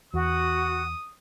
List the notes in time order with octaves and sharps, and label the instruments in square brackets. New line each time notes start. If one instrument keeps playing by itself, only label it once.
[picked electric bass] E2 [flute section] F#4 [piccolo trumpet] D#6